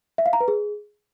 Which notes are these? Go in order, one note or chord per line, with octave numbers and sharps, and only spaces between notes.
E5
F5
A#5
B4
G#4